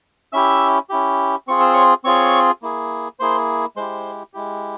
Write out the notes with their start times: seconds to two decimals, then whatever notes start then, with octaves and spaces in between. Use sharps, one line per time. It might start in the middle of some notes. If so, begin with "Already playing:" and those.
0.33 C#4 E4 G4 E5 E6
0.90 C#4 E4 G4
1.48 C4 F4 G#4 C#6
1.60 E6
1.74 C#5 C#6
2.04 C4 F4 G#4 C#5 C#6
2.62 A#3 E4 G#4
3.20 A#3 E4 G#4 C5 C6
3.77 G#3 E4 G4 C5 C6
4.34 G#3 E4 G4